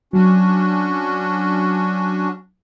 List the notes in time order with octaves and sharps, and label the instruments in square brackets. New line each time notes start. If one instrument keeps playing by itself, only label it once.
[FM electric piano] F#3 [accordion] C#4 D4 F#4